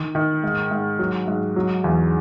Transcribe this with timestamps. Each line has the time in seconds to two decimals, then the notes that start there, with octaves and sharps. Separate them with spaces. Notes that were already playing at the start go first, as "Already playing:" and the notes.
Already playing: D#3
0.15 D#3
0.44 G#2
0.71 G#2
0.99 F#3
1.28 G#2
1.56 F#3
1.84 E2